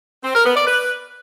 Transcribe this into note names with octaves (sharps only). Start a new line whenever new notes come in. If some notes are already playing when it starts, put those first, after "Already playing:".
C4
A#4
B3
D5
B4